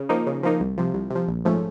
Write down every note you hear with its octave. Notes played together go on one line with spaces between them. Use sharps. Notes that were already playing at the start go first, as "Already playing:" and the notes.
Already playing: C#3
F3 A#3 D#4
C#3
F3 A#3 D#4
C2
C3 F3
C2
C3 F3
A#1
G#2 F3 A3 C#4